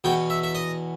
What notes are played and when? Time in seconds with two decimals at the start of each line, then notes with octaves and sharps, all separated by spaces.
0.04 E2 B2 G5
0.30 E5
0.43 E5
0.55 D#5